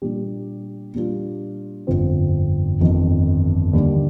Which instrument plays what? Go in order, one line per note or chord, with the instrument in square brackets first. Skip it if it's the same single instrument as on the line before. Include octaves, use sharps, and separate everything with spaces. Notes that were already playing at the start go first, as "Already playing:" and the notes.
[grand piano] A#2 G3 D4 G4
A#2 G3 D4 F4
G1 F2 D3 F3 C4
G1 F2 D#3
D#2 D3 G3 D4